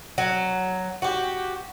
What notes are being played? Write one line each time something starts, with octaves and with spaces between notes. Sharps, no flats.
F#3
F#4 G4